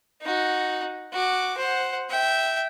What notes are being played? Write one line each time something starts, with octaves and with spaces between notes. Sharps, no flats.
D#4 F#4
F#4 D6
C5 F#5
E5 G5